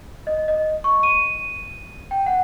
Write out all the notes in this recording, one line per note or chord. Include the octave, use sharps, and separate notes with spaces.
D#5
D#5
C#6
D#7
G5
F#5